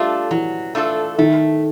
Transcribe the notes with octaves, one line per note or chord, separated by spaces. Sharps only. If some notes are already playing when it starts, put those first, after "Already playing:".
Already playing: G3 A3 D4 F4 A4
E3 F#3
A3 D4 F4 A4
D#3 A3